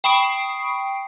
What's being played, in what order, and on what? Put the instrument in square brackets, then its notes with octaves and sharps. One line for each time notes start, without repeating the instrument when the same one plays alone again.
[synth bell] G5 B5 C#6 D#6 C7 D7